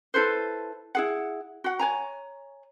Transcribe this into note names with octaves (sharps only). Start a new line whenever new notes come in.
E4 A4 B4 C5
E4 G#4 F#5
F#4 F#5
C#5 G#5 A#5